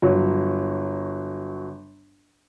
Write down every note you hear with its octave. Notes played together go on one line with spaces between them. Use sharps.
G1 F#3 C#5